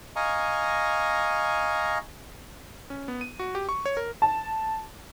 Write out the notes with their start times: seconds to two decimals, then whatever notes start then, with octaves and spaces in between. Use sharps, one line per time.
0.16 D#5 F5 G#5 A#5 C#6
2.90 C#4
3.08 B3
3.21 D#7
3.39 F#4
3.55 G4
3.69 C#6
3.86 C#5
3.97 A#4
4.22 A5